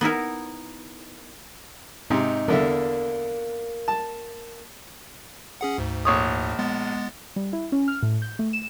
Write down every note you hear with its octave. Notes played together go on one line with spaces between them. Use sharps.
B3 D#4 E4 A#4
G#2 C3 D#4
E2 D3 A#3 E5
A5
C#4 G#4 F#5
D2 G#2
A#1 C#5 D#6
G#3 B3 A6
G3
E4
C#4
F6
A2
G6
A3
E7